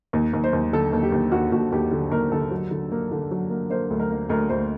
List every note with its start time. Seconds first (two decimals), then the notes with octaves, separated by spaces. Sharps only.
0.13 D#2
0.33 D#2
0.44 C5
0.53 D#2
0.73 D3 A4
0.93 D#2
1.03 G4
1.12 D#2
1.32 D#2 F#4
1.52 D#2 F#4
1.72 D#2 G4
1.91 D3
2.12 D#2 A#4
2.32 D3 A4
2.51 F#3
2.71 D3
2.92 A#3
3.11 D3
3.31 F#3
3.50 A#3
3.70 A#3 C5
3.90 D2
4.00 A#4
4.10 A#3
4.29 D2 A#4
4.49 D2 C5